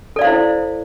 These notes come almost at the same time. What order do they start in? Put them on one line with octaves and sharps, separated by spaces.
A4 D5 F5 C5 E4